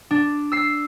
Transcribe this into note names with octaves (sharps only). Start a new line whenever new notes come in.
D4
E6 C7